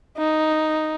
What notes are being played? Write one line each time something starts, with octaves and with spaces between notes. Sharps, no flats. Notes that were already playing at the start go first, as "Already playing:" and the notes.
D#4